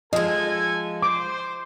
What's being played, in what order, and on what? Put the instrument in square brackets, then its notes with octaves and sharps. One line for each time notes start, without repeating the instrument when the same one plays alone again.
[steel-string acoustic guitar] F3 G#3 [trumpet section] A4 G#5 [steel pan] D#5
[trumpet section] C5 [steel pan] D6